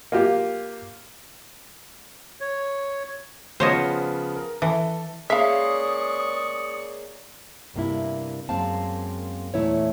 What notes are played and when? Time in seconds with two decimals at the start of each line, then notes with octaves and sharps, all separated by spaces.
0.12 A#3 F4 G4
2.41 C#5
3.60 C#3 F3 B3 C5 C#5 D#5
4.36 A#4
4.62 E3 A4
5.30 G#3 A#3 C#4 D5 E5 F5 C#6 D#6
7.74 G2 C3 A#3 E4
8.49 F#2 G#3 A#3 C4 F5 A5
9.54 E2 A#2 A3 E4 B4 C#5